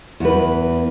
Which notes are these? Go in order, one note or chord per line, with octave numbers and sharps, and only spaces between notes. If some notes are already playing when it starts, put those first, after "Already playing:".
E2 B4